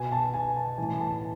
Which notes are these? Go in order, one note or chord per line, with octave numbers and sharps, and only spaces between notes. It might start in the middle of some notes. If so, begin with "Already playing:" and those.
Already playing: B2 G#5
A5
G#5
A5
A2 E3 G#5
A5